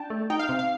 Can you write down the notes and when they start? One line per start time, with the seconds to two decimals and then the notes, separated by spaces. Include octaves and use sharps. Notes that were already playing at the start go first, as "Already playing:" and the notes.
Already playing: D4 G5 A5
0.10 A3
0.30 D#4 G5
0.39 F5
0.49 C3
0.59 F5